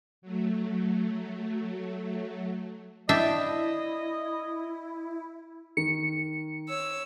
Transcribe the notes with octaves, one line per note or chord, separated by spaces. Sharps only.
F#3 A3
D4 E4 D#5 E5 G5
D#3 C#7
C#5 E6